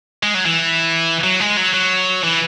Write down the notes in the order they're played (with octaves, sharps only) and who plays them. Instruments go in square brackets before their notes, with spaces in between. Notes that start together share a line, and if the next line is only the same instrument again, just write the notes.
[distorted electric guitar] G#3
F#3
E3
F#3
G#3
F#3
F#3
E3